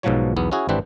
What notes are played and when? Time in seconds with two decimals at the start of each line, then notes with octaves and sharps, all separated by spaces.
0.03 B1 G#2 B2 F3 F#3 C#5
0.36 B1 E2 B3
0.52 C#4 E4 F#4 G#4
0.69 G#1 E3 C4 D4 G4 B4